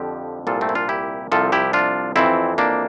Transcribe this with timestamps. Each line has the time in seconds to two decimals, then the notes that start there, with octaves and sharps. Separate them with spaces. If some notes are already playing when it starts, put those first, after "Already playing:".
Already playing: F2 D3 F3 G4
0.47 C2 A#2 F3 F4 A4
0.61 A3 C4
0.69 E4
0.75 D4 F4
0.89 E4 G4
1.32 C2 C3 F3 F4 A4
1.52 E4 G4
1.73 D4 F4
2.16 F2 E3 C4 E4
2.58 A#3 D4